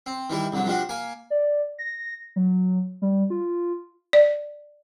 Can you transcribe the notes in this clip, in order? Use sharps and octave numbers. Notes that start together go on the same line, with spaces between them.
C4
D#3 E3 G3 E4
C2 D3 F#3
F3 G3 D4 F#4
A#3 G#5
D5
A#6
F#3
G3
F4
D5